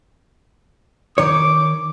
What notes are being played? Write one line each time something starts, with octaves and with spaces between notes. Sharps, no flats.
D#3 C#5 D6